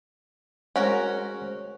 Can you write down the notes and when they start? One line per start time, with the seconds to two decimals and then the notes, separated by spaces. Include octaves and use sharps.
0.76 G#3 C#4 F#4 A#4 C5 C#5